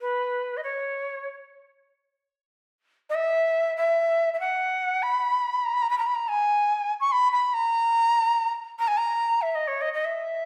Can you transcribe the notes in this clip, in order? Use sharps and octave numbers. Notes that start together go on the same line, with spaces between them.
B4
D#5
C#5
D#5
E5
E5
E5
F#5
B5
A#5
B5
A#5
B5
A#5
B5
A#5
G#5
C#6
B5
B5
A#5
A#5
G#5
A#5
E5
D#5
C#5
D#5
D#5
E5